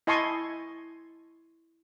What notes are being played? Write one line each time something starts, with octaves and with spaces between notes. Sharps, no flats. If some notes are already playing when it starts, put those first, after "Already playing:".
E4 D#5 G#5 A5 C6 C#6